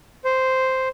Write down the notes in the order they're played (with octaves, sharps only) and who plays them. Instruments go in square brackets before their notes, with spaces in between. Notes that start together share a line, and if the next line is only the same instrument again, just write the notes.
[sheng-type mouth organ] C5